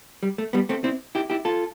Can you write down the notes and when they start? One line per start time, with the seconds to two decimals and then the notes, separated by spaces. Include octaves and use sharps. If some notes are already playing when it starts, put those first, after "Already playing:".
0.23 G3
0.38 A3
0.53 G3 B3
0.69 A3 C4
0.84 C4 E4
1.15 E4 G4
1.30 E4 G4
1.45 F4 A4